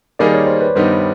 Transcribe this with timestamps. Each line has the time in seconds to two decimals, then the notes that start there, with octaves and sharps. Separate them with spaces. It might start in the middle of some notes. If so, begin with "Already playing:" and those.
0.19 D#3 G3 A#3 D#4 G#4 D5
0.34 C#5
0.47 C5
0.61 B4
0.75 G2 D#3 G3 B3 D#4 C5